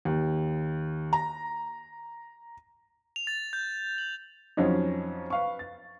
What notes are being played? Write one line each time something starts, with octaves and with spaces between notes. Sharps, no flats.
D#2
A#5
F7
A6
G6
F#7
F2 F3 F#3 C#4 D#4
B4 F5 C#6
A6